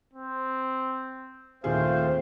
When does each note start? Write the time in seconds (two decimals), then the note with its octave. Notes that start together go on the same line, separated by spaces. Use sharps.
0.13 C4
1.64 D#2 A#2 A3 C4 G#4 C5 F5